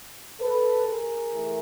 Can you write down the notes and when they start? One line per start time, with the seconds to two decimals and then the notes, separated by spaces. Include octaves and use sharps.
0.39 A4 B4
0.85 G#4 A#4
1.32 E3 A3